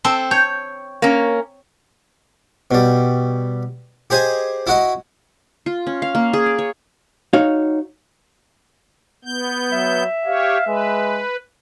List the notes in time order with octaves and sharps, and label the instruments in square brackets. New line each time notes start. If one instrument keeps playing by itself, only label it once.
[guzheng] C4 [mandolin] A4 E6
[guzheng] C#5 [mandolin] G6
[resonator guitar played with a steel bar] A#3 C#4
[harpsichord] B2 G3
G4 G#4 C5 D#5 G#5
E4 F#4 D#5
[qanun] F4
C#4
F5
A#3
G#4
D6
C#5
[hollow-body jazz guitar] D#4 F#4 C#5 F5
[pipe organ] B3 G6
[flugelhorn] F#3 [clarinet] E5
[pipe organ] G4 C#5 [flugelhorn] F5
[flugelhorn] G#3 [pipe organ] B4